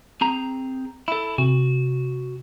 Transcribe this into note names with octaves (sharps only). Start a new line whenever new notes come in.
C4 G#4 A#5
E4 A4
C3 F#4